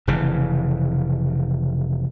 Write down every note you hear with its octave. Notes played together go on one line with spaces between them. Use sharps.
F1 C#3 E3